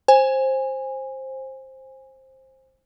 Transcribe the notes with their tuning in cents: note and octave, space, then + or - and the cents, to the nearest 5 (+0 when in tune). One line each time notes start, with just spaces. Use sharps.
C5 +15 G#5 -15